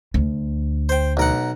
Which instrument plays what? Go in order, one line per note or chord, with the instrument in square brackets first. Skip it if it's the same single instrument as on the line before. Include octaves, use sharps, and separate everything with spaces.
[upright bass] D2
[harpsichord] C5 G5
B1 A#4 F#5